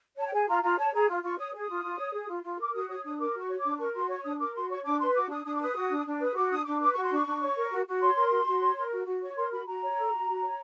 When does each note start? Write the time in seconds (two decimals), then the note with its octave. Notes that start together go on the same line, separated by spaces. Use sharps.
0.17 C#5 A5
0.27 G5
0.33 G#4 G#5
0.48 F4 A#5
0.63 F4 A#5
0.78 C#5 A5
0.93 G#4 A#5
1.09 F4
1.23 F4 C#6
1.38 C#5 D#6
1.53 G#4
1.60 D#6
1.69 F4
1.83 F4
1.98 C#5
2.13 G#4
2.29 F4
2.43 F4
2.59 A#4 D6
2.74 F#4 D#6
2.89 C#5 D#6
3.04 D4 D#6
3.19 A#4 D6
3.34 F#4 C#6
3.49 C#5
3.60 D4 D6
3.79 A#4 C#6
3.94 F#4 C6
4.09 C#5 C#6
4.24 D4 D#6
4.39 A#4 D6
4.54 F#4 C6
4.70 C#5 C#6
4.84 D4 D6
5.00 B4 C6
5.15 F#4 D6
5.29 D4 D#6
5.45 D4 D#6
5.55 D6
5.61 B4 D#6
5.75 F#4
5.90 D4
6.05 D4
6.21 B4 D#6
6.36 F#4 D6
6.50 D4 D#6
6.66 D4 D6
6.80 B4 D6
6.92 F#4 C#6
7.04 C6
7.10 D4 C#6
7.26 D4
7.41 C#5
7.56 A#4
7.70 F#4
7.87 F#4
8.01 C#5 C6
8.16 A#4
8.31 F#4
8.46 F#4
8.61 C#5
8.77 A#4
8.91 F#4
9.06 F#4
9.21 C#5 C#6
9.36 A#4 C6
9.52 F#4 B5
9.66 F#4 A#5
9.82 C#5
9.97 A4
10.12 F#4
10.27 F#4
10.43 C#5